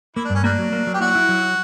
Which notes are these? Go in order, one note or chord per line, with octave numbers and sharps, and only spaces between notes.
A#3 E4
D4
G2 C#4
G3 A#3 D4
F#3
A#3
F#3
G4
D4 E4 F#4
E4
F#3